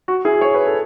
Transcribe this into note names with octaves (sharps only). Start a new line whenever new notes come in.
F#4
E4 G#4
C#5
B4
A4